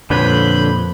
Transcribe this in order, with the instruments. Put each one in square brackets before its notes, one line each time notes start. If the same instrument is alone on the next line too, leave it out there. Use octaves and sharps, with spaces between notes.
[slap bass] F2 [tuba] A#2 [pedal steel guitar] D3 B4 C#5 [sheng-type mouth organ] B5 G6